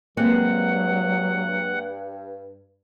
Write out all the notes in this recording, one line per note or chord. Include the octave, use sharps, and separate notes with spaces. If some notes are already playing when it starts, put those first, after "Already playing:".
G2 F#3 G#3 A#3 C4 F#5